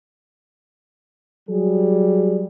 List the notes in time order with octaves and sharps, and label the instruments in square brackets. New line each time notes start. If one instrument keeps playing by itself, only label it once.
[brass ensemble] F#3 G3 G#4